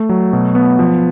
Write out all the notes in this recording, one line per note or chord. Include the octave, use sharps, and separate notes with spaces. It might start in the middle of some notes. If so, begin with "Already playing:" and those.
Already playing: A3
F#3
B2
B3
F3